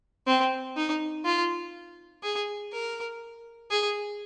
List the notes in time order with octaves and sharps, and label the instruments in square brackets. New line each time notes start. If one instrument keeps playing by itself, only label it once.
[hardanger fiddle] C4
D#4
F4
G#4
A#4
G#4